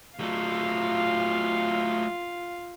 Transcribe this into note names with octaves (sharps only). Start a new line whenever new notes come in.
F#3 A3 F4 F5